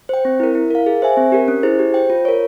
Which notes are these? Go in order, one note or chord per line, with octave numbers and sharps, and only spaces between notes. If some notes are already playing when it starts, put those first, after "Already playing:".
C5 G5
C4
E4 A#4
E4
A#4 F5
G#4
C5 E5 G#5
C4
G4 A#4
C#4
E4 G#4 C5
G4
C5 G5
F4
A#4 C#5